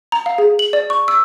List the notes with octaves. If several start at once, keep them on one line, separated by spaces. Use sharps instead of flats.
A#5
F5
G#4
F#7
D5
C#6
E6